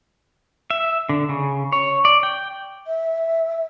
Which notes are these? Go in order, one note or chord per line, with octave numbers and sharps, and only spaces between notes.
E5
D3
C#3
C#5
D5
G5
E5